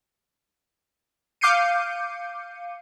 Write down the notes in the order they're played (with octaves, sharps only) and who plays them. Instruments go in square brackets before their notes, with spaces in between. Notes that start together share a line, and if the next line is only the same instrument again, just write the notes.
[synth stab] F5 D6 G6 C7 C#7 D#7